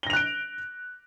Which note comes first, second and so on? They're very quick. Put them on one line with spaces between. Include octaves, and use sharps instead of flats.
G7 A#6 F7 F#6 D7